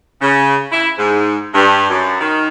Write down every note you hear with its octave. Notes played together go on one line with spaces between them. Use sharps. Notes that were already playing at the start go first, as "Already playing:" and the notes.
C#3
E4
G#2
G2
F#2
D#3